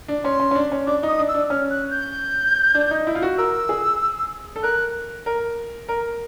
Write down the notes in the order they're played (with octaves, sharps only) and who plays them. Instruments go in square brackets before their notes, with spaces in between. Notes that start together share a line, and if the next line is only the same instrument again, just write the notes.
[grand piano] D4
[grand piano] C#4 [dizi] C6
[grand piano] C#4
C#4
D4
C#4
[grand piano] D4 [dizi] D6
[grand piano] D#4 [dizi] D#6
[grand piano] D4
[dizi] E6
[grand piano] D4
[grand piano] C#4 [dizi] F6
[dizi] F#6
G6
[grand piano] D4
D#4
E4
F4
F#4
[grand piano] A#4 [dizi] E6
[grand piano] G#4
A4
[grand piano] A#4 [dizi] F#6
[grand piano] A#4
A#4